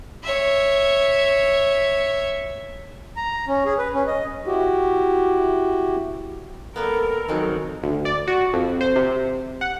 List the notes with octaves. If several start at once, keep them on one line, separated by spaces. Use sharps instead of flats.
C#5 E5
A#5
C#4
G#4
B4
C#4
D#5
E4 F#4 G4
G3 A#3 B3 A4 A#4
D#3 F3 F#3 G#3 C4
D2
D5
F#4
F2
C5
C3
F#5